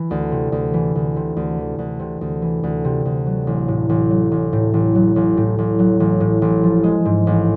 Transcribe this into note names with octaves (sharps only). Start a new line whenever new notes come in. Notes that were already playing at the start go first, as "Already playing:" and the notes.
Already playing: E3
D2
C3
D2
E3
D2
C3
D2
E3
D2
C3
D2
E3
D2
C3
D2
F#3
A1
A2
A1
F#3
A1
A2
A1
F#3
A1
A2
A1
F#3
A1
A2
A1
F3
G#3
G#2
A1